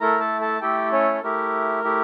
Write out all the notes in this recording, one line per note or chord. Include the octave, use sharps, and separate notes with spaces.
A3 E4 A4 A#4 A#5
A4 A5
A4 A5
A3 E4 G4 A4 G5
C#4 C#5
A4
A3 E4 G4 A#4
A3 E4 G4